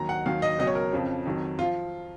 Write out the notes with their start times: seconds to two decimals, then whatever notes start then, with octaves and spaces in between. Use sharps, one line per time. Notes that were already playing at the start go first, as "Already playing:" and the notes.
Already playing: D#2 D#3 F#3 A#5
0.09 F#5
0.25 D#2 D#3 F#3 F5
0.42 D#5
0.59 C#2 B2 F#3 D#5
0.67 C#5
0.75 A#4
0.93 F2 C#3 F3
1.25 F2 D#3 F#3
1.59 F4
1.61 F3